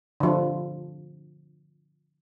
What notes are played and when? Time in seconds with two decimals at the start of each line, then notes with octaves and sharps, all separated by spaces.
0.20 D3 F3